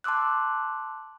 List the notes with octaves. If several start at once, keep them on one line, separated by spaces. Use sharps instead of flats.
A5 C6 D6 E6 F#6